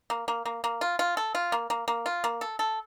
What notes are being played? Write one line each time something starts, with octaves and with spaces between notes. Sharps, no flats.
A#3
A#3
A#3
A#3
F4
F4
A4
F4
A#3
A#3
A#3
F4
A#3
A4
A4